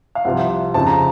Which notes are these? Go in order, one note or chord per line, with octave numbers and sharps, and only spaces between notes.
F5
C2 C3 F3 F#5
F2 C#3 F3 A5
A#5